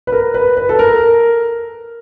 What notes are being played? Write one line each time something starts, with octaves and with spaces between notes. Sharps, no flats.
B4
A#4
B4
B4
A4
A#4